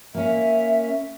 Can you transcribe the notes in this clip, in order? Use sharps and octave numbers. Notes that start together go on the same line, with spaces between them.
A#3 C#4 E5